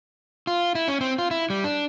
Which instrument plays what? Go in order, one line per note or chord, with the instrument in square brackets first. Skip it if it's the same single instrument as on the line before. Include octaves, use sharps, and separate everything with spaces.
[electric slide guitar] F4
E4
C#4
C4
F4
E4
G3
D4